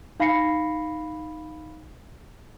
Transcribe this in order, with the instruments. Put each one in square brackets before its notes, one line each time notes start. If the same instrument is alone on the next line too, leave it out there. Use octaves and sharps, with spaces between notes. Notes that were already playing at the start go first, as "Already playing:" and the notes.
[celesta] D#4 F5 B5 A#6 C7 C#7